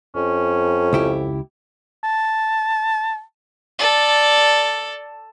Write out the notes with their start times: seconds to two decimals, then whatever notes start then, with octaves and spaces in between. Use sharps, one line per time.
0.15 F2 C#4
0.93 C#2 E4 G4
2.03 A5
3.79 A4 D5